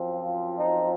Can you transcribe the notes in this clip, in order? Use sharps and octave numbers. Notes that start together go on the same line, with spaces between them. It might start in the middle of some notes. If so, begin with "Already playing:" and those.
Already playing: F#2 F3 C4
F4
D#4